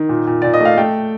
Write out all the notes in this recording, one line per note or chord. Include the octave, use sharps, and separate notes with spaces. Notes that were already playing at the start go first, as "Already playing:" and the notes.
Already playing: D#3
A#2
A#2
A#2 D5
D#5
A3 F5
A3 G5